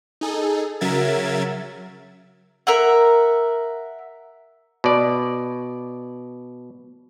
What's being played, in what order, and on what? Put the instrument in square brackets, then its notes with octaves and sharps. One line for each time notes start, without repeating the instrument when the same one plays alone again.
[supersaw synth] D#4 G#4 A4
C#3 F#3 A#4 E5 G#6 A6
[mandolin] A#4 E5 F#5
[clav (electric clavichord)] B2 D5